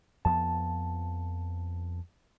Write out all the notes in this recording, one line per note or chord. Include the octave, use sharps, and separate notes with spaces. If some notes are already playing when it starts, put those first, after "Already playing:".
F2 F3 B3 A5